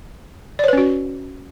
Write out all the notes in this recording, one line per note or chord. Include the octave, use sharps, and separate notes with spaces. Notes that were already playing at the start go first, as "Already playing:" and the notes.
C#4 F#4 B4 C#5 D5